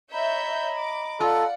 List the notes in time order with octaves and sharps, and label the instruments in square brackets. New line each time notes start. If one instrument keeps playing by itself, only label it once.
[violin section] C#5 E5 G6 [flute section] D#5 A#5 B5
[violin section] D6
[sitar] F4 [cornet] A4 [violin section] D5 F#5